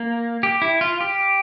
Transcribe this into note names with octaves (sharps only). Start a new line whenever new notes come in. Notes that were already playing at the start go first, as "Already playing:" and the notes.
Already playing: A#3
G4
E4
F4
G4